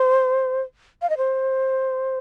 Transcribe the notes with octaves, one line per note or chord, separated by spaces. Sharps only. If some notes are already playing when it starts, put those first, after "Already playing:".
Already playing: C5
F5
D#5
C5